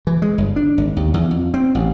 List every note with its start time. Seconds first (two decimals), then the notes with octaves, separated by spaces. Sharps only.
0.07 E3
0.22 G#3
0.38 G1
0.56 D4
0.78 G#1
0.97 D#2
1.14 E2
1.31 F2
1.54 C4
1.75 A1